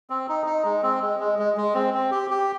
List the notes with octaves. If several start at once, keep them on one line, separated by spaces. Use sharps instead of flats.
C4
D#4
D#4
G#3
C4
G#3
G#3
G#3
G#3
C4
C4
G4
G4